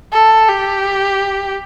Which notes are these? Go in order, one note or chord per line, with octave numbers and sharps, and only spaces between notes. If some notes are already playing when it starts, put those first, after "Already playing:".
A4
G4